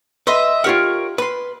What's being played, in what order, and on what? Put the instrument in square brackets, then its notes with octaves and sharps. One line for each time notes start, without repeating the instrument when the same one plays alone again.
[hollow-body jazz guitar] B4 [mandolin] D#5 E5 C6
[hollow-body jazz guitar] F4 G4 F#5 [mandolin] A#4 C#5
[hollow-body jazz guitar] B4 [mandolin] B5 C6